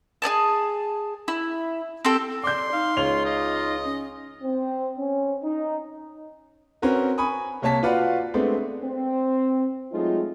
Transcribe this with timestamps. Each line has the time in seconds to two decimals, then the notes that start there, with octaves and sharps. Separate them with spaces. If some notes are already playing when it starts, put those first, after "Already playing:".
0.22 G#4 D5 G#5 A5
1.28 E4
2.05 C4 G4 A4 G5
2.44 D5 C6 D6 G6
2.73 D#4 F5
2.97 C#2 F4 C#5 F7
3.25 D#5
3.84 C#4
4.42 C4
4.97 C#4
5.43 D#4
6.82 C4 C#4 F#4 A#4 B4
7.18 G#5 B5 C#6 D#6
7.62 C2 A#3 C#5 A5 B6
7.83 F4 F#4 B4 D5 F5 F#5
8.34 G#3 A3 B3 C4 D4
8.83 C4
9.92 F#3 G#3 A3 C4 D#4 F4